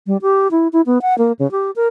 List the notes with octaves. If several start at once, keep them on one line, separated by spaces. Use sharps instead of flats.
G3
G4
E4
E4
B3
F#5
A#3
C#3
G4
A#4